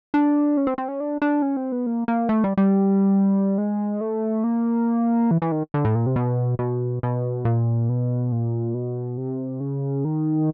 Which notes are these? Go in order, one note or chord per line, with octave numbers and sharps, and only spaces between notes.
D4
C#4
C4
C4
C#4
D4
D4
C#4
C4
B3
A#3
A#3
A3
G3
G3
G#3
A3
A#3
E3
E3
D#3
D3
A2
A#2
C3
B2
B2
B2
A#2
B2
A#2
B2
C3
C#3
D#3